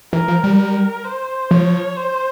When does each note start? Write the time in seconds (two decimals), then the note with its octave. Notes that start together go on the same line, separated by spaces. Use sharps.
0.13 E3 A#4
0.28 F3
0.44 G3
0.59 A#4
1.05 C5
1.51 F3 C#5
1.97 C5